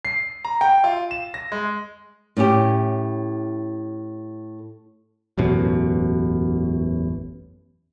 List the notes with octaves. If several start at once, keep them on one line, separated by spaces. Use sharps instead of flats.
C7
A#5
G5
F4
E7
A#6
G#3
A2 C#4 E4 G4
E1 A1 F#2 B2